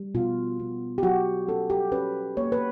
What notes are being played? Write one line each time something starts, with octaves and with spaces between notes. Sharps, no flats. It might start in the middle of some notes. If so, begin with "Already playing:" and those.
Already playing: G3
B2 F4
B3
G4
F#3 F#4
C#4 A4
G4
C#4 B4
A#3 C#5
B4